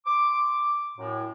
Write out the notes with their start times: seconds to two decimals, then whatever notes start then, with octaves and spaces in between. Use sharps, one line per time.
0.06 C6 D6
0.98 F#2 A2